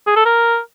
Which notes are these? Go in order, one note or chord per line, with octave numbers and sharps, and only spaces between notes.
G#4
A4
A#4